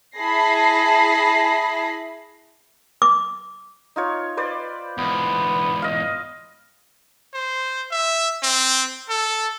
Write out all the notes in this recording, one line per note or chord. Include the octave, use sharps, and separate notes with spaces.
E4 G#4 A5 B5 A#6 C7
D6
D#4 F4 C#5
B4 C5 D5
E2 G#2 B3
D#5 F5
C5
E5
C4
A4